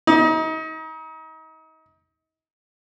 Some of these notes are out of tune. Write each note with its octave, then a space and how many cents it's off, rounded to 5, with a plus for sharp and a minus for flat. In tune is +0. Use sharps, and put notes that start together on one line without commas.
D#4 +35